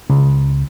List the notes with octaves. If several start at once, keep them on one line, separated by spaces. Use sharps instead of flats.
C#2